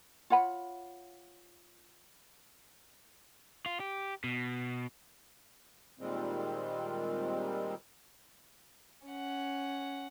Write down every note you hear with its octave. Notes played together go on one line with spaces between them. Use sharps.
F4 C#5 F#5 B5
F4
G4
B2
A#2 D#3 G3 G#3 C4
C#4 F#5